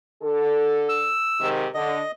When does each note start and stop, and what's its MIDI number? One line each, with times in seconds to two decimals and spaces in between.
0.22 1.12 50
0.22 1.12 69
0.89 1.49 88
1.40 1.65 44
1.40 1.65 48
1.40 1.65 51
1.74 1.99 50
1.74 2.11 75